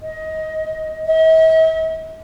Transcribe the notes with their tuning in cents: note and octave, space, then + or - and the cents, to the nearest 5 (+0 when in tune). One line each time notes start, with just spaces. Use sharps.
D#5 +20
E5 -45